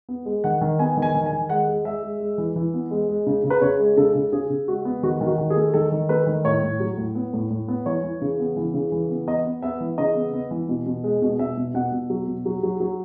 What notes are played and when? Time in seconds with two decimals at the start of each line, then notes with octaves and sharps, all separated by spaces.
0.09 B3
0.26 G#3
0.44 D#3 F#5
0.61 D#3
0.79 B3 G#5
0.97 D#3
1.02 G#5
1.15 D#3
1.26 G#5
1.32 D#3
1.50 G#3 F#5
1.68 G#3
1.85 G#3 E5
2.03 G#3
2.20 G#3
2.38 E3
2.56 E3
2.74 B3
2.91 G#3
3.09 G#3
3.26 C#3
3.44 C#3
3.50 B4
3.62 C#3 C#5
3.79 G#3
3.97 C#3 A4
4.15 C#3
4.32 C#3 G#4
4.50 C#3
4.68 G#3 F#4
4.85 B3
5.03 D#3 F#4
5.21 D#3
5.27 F#4
5.39 D#3
5.50 G#4
5.56 A3
5.74 D#3 A4
5.92 D#3
6.09 A3 B4
6.27 D#3
6.44 A2 C#5
6.62 A2
6.80 F#3
6.97 A2
7.15 B3
7.33 A2
7.50 A2
7.68 B3
7.86 E3 C#5
8.03 E3
8.21 C#3
8.40 B3
8.56 E3
8.74 C#3
8.92 E3
9.10 B3
9.27 B3 D#5
9.45 B3
9.62 B3 E5
9.80 E3
9.98 C#3 D#5
10.16 B3
10.34 B3
10.51 E3
10.69 B2
10.86 B2
11.04 G#3
11.22 B2
11.39 B2 E5
11.57 B2
11.74 B2 F#5
11.92 B2
12.10 F#3
12.28 B2
12.46 F#3
12.63 F#3
12.80 F#3